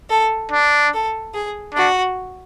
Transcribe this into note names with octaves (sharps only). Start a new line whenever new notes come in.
A4
D4
A4
G#4
D4 F#4